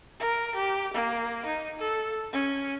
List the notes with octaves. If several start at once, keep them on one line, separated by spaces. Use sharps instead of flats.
A#4
G4
A#3
D#4
A4
C#4